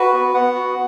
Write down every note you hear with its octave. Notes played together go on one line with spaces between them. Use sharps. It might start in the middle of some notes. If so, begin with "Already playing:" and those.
Already playing: F#4 B4
B3
B3 F#5
F#4